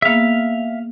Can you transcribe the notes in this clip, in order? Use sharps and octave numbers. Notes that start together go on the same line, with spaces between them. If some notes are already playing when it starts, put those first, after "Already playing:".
A#3 B3 G#4 E5 F5